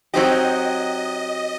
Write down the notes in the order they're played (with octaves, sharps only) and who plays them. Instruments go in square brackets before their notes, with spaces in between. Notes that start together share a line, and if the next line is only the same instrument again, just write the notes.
[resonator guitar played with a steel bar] F#3 C4 D#4 G4 [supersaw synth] D#5